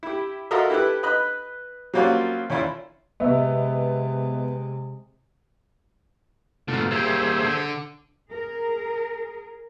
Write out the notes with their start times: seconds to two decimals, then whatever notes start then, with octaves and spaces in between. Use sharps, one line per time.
0.03 E4 G4
0.51 F4 F#4 A4 A#4 D#5 E5
0.70 E4 G4 A4 B4
1.03 B4 D#5 B5 F#6
1.94 F#3 G3 A#3 C4 C#4 F4
2.50 D#2 C#4 E4 F4 D5
3.20 C3 G#3 B3 D#5 E5
6.68 G#2 B2 D3 A3 F4
6.91 G3 A#3 G#4 C5 E5
7.43 D3
8.31 G#4 A#4